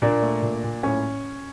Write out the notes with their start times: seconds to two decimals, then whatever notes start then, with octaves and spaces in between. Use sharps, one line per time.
0.02 A#2 A#3 D4
0.22 A3
0.43 A#2
0.64 A#2
0.83 A2 C#4